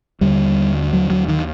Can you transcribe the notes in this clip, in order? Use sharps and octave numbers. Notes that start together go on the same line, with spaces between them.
D#2 D3 G3
F#3
F#3
D#3